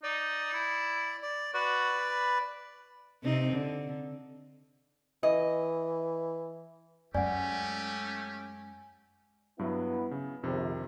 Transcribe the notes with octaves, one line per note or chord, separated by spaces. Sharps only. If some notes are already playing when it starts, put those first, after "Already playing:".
D#4 D5
E4
D5
F#4 B4 D5
B5
C3 C4 D#4
D3
E3 D#5
F#2 G#3 A3 C#4 G4 D5 F#5 G#5
G2 F#3 B3 E4
C#3
A#1 F2 C3 D#3